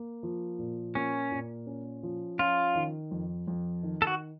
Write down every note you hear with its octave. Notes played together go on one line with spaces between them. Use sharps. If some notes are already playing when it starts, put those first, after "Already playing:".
Already playing: A#3
F3
A#2
A#3 C#4
A#2
C#4
F3
C#4 F4
D#3
F2
F2
D#3
A4
F#4